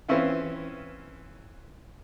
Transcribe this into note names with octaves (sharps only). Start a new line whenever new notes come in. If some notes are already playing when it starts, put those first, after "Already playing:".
E3 C4 C#4 E4 F4